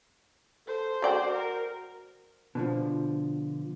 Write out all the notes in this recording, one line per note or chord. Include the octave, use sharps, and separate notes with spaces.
A4 C5
G#3 F#4 D5 G5
A#4
B2 D3 F3